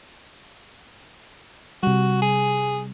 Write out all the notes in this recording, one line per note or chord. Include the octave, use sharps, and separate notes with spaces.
C3 G3 F#4
G#4